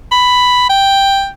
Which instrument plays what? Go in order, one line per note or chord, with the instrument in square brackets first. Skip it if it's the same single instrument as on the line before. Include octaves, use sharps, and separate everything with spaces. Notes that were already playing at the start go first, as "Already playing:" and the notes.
[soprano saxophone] B5
G5